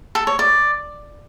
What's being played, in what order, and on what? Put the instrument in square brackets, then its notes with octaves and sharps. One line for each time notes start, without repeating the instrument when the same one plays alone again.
[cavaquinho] A4
C#5
D5